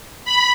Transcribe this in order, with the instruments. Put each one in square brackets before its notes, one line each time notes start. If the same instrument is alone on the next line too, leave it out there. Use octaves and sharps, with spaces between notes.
[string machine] B5